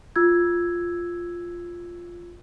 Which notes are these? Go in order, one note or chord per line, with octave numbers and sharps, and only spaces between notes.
F4 E6 G#6